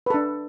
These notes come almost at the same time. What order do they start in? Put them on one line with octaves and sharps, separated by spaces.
B4 A4 D4